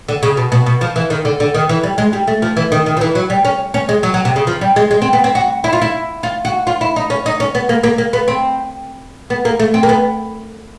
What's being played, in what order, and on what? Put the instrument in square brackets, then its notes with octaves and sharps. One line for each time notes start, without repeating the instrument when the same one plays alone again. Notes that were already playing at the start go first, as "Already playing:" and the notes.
[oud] D3
C#3
B2
B2
B2
F3
E3
D#3
D3
D3
D#3
E3
G3
G#3
G3
A3
F3
E3
D#3
D#3
F3
E3
F#3
G3
C#4
C#4
G#3
F#3
F#3
C3
C#3
F3
G3
G#3
G#3
C4
B3
C4
F#4
E4
F4
E4
F4
F#4
F4
E4
D#4
C#4
D#4
C#4
B3
A#3
A#3
A#3
B3
C4
B3
A#3
A3
C4
A#3
B3